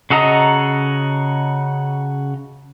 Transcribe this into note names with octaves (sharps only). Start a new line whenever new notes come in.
C#3 F#4 A4 D#5 A#5